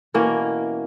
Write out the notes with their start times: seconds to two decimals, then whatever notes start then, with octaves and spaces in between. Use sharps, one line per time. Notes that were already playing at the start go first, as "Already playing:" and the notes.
0.14 B2 E3 A#3 C#4